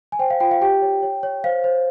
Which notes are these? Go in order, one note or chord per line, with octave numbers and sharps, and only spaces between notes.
G#5
C5 G5
F5
F4 G5
F5
G4 G5
C#5
C#5
C#5
C5 F5
C5